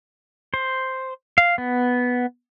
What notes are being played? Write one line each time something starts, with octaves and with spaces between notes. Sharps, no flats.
C5
F5
B3